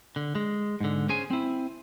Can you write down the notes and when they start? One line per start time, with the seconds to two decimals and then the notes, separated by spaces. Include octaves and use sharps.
0.16 D3
0.35 G#3
0.81 G#2 D3
1.09 C#4 G#4 C5 G#5
1.31 C4 E4